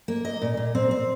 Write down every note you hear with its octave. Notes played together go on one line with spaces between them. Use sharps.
A#3
D#5
A#2
A#2
C4
C4